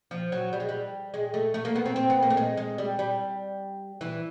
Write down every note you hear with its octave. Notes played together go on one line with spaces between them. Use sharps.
F3
F#3
G3
G#3
G3
G#3
A3
A3
A#3
B3
C4
C4
B3
A#3
A3
G#3
G#3
G3
G3
E3